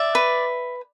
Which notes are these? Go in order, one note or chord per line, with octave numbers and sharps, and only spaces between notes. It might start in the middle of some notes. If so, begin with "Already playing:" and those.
Already playing: D5 E5
B4